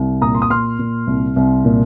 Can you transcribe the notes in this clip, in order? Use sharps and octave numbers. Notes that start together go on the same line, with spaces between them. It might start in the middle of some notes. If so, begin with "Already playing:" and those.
Already playing: C2
A#2 A#5 D#6
C6
D#6
A#2 C6 F6
A#2
C2
C2
A#2